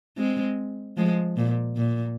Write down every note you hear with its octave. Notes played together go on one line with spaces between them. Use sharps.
G#3 C4
F3 G#3
A#2
A#2